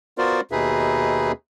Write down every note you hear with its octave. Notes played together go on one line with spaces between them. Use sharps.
B3 F4 F#4 A#4 C5 D5
D#2 B2 D#4 G#4 B4 E5